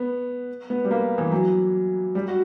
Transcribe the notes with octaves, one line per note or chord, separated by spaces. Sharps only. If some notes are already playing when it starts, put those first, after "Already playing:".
Already playing: B3
B3
G3
A#3
E3
F#3
G3
F#4